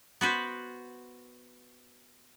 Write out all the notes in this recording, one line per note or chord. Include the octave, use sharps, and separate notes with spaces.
B3 F#4 B4 C5